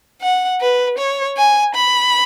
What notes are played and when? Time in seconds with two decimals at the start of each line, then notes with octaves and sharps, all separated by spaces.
0.21 F#5
0.61 B4
0.98 C#5
1.37 G#5
1.74 B5